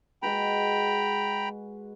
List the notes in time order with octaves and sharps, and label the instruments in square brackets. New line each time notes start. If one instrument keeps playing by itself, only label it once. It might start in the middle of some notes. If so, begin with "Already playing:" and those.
[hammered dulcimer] G#3 F#4 B4 [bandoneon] G5 A#5 B5